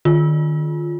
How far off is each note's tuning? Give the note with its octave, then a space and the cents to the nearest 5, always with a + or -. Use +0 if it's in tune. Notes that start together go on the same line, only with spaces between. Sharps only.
D#3 -35 F4 +0